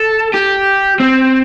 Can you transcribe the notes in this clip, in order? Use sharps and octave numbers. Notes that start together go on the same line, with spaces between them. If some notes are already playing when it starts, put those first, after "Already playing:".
Already playing: A4
G4
C4